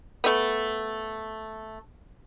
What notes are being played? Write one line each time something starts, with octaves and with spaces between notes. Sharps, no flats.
A3 B3